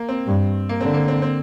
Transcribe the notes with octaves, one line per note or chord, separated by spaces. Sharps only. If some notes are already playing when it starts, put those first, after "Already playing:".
Already playing: A#3
C4
G2
A#3
D3 C4
A#3
C4
C4